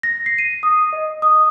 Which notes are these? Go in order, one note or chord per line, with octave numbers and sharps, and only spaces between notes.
A#6
C7
D#7
D#6
D#5
D#6